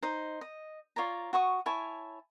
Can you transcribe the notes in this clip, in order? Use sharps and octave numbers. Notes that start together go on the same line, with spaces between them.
D#4 C5
D#5
F4 C#5 D5 A#5
F#4 C#6 D#6
E4 C#5 G#5 A5